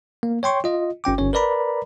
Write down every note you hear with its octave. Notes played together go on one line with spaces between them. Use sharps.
A#3
C#5 G5 C6 C#6
F4 D#5
G1 C#4 G5 D6
G1 C#4 C#5
A#4 B4 D5 A#5 B5